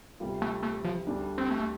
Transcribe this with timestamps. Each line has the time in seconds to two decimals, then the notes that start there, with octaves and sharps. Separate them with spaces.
0.20 D2 C3 G3 F4
0.42 A3
0.63 A3
0.84 F3
1.07 D2 D3 G3 D4
1.38 C4
1.50 A3